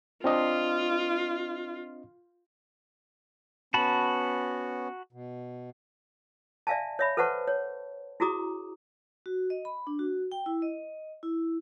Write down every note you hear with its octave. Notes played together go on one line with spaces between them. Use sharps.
C4 D4 F4 D#5
B3 C#4 F#4 A5 B5
B2
D5 E5 F5 G#5 A5
C#5 E5 B5
A4 B4 C5 F#5 A5 C#6
C#5
E4 F#4 G#4 A#5 D6 D#6
F#4
D#5
B5
D4
F#4
G5
E4
D#5
E4